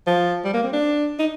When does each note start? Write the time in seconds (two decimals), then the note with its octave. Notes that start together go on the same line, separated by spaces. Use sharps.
0.07 F3
0.45 G3
0.54 A#3
0.64 C4
0.73 D4
1.19 D#4